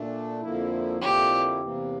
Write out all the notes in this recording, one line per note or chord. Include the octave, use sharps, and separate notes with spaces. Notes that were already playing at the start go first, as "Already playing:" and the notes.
Already playing: A#2 A3 D4
F2 D3 F3 A#3 E4
F2 D3 F3 A#3 E4 G4
E2 C3 E3 A#3